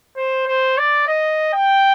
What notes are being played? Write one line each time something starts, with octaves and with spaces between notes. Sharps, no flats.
C5
C5
D5
D#5
G5